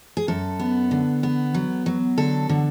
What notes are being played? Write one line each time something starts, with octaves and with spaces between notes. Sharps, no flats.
G#4
F#2 A4
B3
D3
B3
F#3
F#3
D3 A4
D3